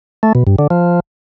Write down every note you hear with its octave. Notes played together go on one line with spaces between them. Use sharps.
A3
B2
G2
D3
F3